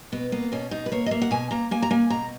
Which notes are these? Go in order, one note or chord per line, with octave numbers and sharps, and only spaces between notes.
B2 B3
A#3 B3
B2 C#4
B2 D#4
B4
A#3 C#5
D#5
A#3 E5
F#5
B2 G#5
A#3 A#5
A#3 G#5
A#5
A#3 G#5
B2 A#5